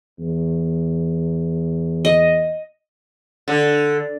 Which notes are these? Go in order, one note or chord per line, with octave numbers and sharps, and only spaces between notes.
E2
D#5
D3